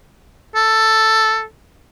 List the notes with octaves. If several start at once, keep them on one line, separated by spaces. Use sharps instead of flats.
A4